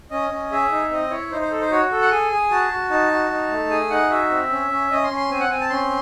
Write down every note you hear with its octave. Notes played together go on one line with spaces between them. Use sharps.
C#4 D#5
C#4
G#4 E5
D#4
C4 D#5
E4 C#5
D#4 C5
C5
A4
C5
F#4 C#5
A4
F#5
G#4 G#5
G#4
F#4 A5
F#4
D#4 A5
F#4
D#4
A3
G#4 G#5
D#4 F#5
F#4 E5
C4
C#4
C#4
C#4 D#5
C6
C#4
C6
C4 G#5
F#5
C4 G#5
A5
C#4 C6